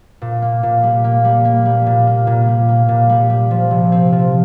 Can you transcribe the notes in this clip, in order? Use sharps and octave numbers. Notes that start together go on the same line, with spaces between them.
A#2
A#3
A#2
G3
A#3
G3
A#3
G3
A#2
A#3
A#2
G3
A#3
A#2
G3
G3
F3
C3
C4
F3